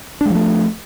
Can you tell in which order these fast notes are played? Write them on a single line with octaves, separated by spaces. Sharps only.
D4 G#3 F3 A3